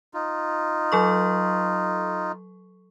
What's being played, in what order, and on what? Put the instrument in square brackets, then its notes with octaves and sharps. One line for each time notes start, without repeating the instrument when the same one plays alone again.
[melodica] D#4 F4
[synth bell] F#3 A4 C#6